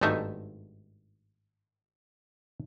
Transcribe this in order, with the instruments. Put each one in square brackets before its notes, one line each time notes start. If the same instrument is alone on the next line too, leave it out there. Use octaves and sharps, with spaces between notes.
[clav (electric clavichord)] G#1 G2 G#3 A3 D#4 E5